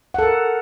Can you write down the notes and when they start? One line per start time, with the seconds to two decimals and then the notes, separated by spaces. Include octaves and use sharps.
0.14 F#5
0.19 A4
0.23 A#4